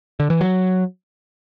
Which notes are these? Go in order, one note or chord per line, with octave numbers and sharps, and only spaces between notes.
D3
E3
F#3